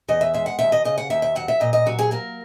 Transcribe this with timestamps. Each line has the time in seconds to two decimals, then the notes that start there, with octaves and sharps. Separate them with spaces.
0.08 E2 D#5
0.21 E5
0.34 G#3 E5
0.46 F#5
0.59 D#2 E5
0.72 D#5
0.85 C#3 D#5
0.98 F#5
1.10 D#2 E5
1.22 E5
1.35 F#3 F#5
1.48 E5
1.60 A#2 D#5
1.73 D#5
1.86 F#3 F#4
1.99 G#4
2.11 A#3 A#4